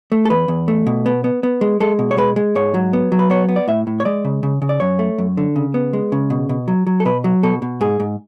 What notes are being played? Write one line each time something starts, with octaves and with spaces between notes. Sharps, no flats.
A3
A4
E2 B4
E2
A3
B2
B3
B3
B3
G#3
G#3 A4
B2
C#5
G#3 B4
G#3
G#2 C#5
F#3
B3
F#3
B4
B3 C#5
B3
D5
A2 E5
A2
C#5
G#3 D5
C#3
C#3
C#3
D5
F#2 C#5
A3
F#2
D3
C#3
B3
G#3
C#3
B2
B2
F#3
F#3
A4
B2 B4
F#3
B2 A4
B2
G#2 G#4
G#2